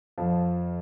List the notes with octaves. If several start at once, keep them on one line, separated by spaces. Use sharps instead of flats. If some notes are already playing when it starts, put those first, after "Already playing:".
F2 F3